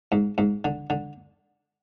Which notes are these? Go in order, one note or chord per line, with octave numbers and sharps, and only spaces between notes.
G#2
G#2
D3
D3